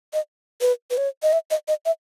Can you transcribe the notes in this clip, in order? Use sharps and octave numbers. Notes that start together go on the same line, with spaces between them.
D#5
B4
B4
C#5
D#5
E5
D#5
D#5
E5